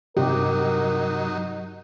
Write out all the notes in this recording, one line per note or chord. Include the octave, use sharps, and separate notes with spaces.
G2 C3 F#3 D#4 G4 A#4